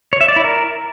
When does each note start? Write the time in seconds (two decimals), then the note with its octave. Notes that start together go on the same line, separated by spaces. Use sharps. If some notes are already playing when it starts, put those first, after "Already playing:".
0.13 C#5
0.21 E5
0.28 D5
0.36 E4
0.44 A#4